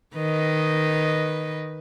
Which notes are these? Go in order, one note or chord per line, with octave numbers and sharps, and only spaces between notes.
D#3 B4 D#5